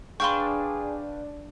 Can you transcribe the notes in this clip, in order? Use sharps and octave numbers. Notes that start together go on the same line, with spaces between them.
D4 G#4 B4 F5 G5 C6 C#6